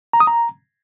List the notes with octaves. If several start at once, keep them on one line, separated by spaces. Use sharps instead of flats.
A#5
D#6
A#5